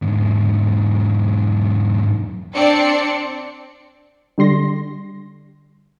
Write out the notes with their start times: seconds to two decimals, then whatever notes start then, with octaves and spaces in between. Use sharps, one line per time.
0.02 E2 G#2
2.54 C4 D4 D5 C#7
4.38 D3 G3 C6 A#6